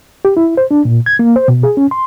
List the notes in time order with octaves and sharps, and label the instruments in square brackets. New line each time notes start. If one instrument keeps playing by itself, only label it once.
[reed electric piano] G4
E4
C5
D4
A#2
G#6
A#3
C5
B2
G#4
C#4
C6